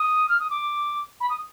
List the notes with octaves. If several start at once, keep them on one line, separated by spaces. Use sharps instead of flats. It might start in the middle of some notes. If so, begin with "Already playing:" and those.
Already playing: D#6
F6
D#6
D6
B5
D#6